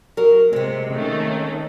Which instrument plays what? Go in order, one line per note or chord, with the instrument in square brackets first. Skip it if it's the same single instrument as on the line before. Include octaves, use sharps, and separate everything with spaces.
[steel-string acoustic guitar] F#3 A#4
[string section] C3 [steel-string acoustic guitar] G#3 C4
[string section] D#3 A3 C#4